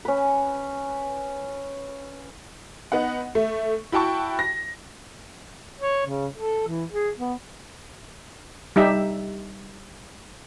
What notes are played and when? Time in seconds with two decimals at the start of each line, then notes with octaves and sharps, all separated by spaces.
0.05 C#4 B4
2.92 B3 D#4 F#5
3.35 A3
3.92 E4 F#4 G5 A5 C#6
4.39 A#6
5.80 C#5
6.06 C#3
6.37 A4
6.68 E3
6.92 G#4
7.18 B3
8.76 G3 D#4 G4 E5